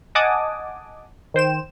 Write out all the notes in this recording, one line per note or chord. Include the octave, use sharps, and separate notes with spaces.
D#5 F#5 G#5 A5 D6 D#6
D#3 C5 G5 E7